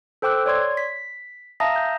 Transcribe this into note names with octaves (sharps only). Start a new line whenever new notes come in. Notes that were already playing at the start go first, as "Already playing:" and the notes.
A4 C5 G5 D6 E6 F#6
C#5 D5 C6 G#6
B6
E5 F5 A5 A#5 D#6 A#6
G6